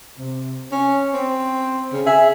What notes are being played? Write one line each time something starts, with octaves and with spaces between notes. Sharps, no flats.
C3
C#4
C4
C#3
G#4 E5